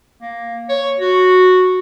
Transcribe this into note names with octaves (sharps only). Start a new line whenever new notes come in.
A#3
C#5
F#4